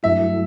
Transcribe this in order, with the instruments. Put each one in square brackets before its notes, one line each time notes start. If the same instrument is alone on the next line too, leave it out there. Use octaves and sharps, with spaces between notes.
[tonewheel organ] G2 F#3 A3 E4 [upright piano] E5